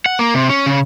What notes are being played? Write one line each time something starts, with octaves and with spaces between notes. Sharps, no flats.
F#5
A#3
C3
C#4
C#3